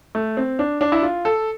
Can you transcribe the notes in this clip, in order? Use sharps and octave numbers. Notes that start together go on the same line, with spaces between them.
A3
C4
D4
D4
E4
F4
A4